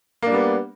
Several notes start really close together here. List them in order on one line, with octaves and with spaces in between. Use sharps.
A#3 D4 G3 B3